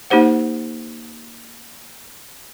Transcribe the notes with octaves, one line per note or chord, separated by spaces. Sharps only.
A#3 D#4 G4 C5 F#5